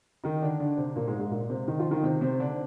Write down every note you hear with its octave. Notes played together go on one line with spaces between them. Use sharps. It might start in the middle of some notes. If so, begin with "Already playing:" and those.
D#3 D#4
D3 D4
D3 D4
C3 C4
A#2 A#3
G#2 G#3
G#2 G#3
A#2 A#3
C3 C4
D#3 D#4
F3 F4
D#3 D#4
C3 C4
C3 C4
D3 D4